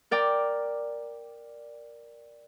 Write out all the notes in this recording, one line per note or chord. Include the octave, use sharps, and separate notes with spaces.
A#4 D5 G5